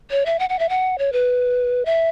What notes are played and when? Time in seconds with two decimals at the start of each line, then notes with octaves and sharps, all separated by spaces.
0.11 C#5
0.26 E5
0.39 F#5
0.49 F#5
0.59 E5
0.69 F#5
0.98 C#5
1.13 B4
1.86 E5